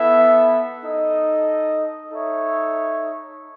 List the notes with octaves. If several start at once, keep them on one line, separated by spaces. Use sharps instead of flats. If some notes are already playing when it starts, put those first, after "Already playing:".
Already playing: B3 E4 A4 E5
D#4 A4 D#5
D#4 A4 C#5 E5